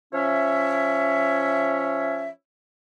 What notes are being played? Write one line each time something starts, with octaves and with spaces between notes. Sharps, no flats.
F3 C#4 C#5 E5